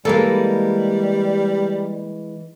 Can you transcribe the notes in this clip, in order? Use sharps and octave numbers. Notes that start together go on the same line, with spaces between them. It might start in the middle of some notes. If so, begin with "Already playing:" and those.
E3 G3 G#3 A#3 A4